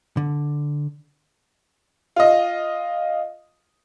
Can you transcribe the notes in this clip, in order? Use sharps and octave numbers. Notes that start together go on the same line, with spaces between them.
D3
F4 D#5